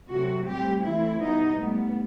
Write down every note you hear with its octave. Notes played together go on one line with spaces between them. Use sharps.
C3 F#3 A3 F#4
A2 G3 C4 G4
E3 A3 C4 E4
B2 G3 B3 D#4
A2 G3 B3